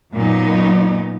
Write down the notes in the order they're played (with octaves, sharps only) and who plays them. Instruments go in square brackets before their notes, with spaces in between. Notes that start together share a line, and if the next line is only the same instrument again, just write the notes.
[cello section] F#2 A#2 F#3 A#3 B3 D#4